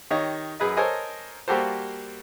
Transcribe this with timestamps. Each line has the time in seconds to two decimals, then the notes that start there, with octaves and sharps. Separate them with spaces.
0.11 D#3 G4 C#5 D#5
0.60 F#2 G#4 B4 D#5
0.77 A4 A#4 C5 C#5 D#5 G#5
1.48 G3 A#3 F#4 G4 A4 C5